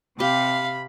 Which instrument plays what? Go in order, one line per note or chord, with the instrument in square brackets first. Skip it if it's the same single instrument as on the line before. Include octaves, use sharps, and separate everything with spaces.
[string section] C3 [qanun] G4 [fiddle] F5 [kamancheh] B5